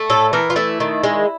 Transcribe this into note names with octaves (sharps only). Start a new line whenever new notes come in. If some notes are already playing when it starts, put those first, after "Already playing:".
Already playing: A3
A2 A4
E3 A#4
F4
A3 E4
D#3
G#3